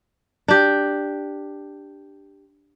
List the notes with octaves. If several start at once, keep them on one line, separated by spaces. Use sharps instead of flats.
D4 G4